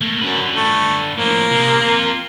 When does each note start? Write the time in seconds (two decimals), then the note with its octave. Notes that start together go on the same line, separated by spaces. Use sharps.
0.01 A3 A#3
0.21 F#2 D3 B4
0.56 A3
1.17 A2 F3 A#3
1.51 C3 G#4
1.81 C4 F4